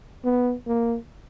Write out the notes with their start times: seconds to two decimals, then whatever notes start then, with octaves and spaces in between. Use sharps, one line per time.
0.24 B3
0.67 A#3